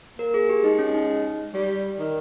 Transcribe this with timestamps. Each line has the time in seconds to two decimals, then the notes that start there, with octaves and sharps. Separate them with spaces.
0.19 A#3 A#4
0.34 G#4
0.49 G4
0.64 G#3 D#4
0.79 C#4
0.94 D#4
1.54 G3 G4
1.99 D#3